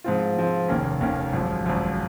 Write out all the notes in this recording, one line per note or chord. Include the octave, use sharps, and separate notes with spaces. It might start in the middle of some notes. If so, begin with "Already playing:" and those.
G#2 F3 C4 F4
G#2 F3 C4 F4
F1 D#2 D#3 A#3 C#4
F1 D#2 D#3 A#3 C#4
G#1 F#2 F3
G#1 F#2 F3